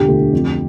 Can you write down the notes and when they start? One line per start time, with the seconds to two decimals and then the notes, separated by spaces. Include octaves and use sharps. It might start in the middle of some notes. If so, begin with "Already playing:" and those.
Already playing: E1 D3 G4
0.08 D2
0.33 F2